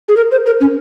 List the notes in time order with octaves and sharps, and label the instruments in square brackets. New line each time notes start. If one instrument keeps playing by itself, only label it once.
[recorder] G#4
A#4
C5
A#4
C#4